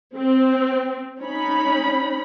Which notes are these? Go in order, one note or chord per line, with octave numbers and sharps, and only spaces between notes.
C4
C#4 D#4 B5